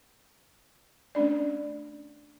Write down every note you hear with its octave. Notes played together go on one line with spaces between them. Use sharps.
A3 C#4 D4 D5